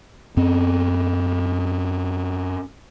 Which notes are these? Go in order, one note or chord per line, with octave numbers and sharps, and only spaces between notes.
F#2 C4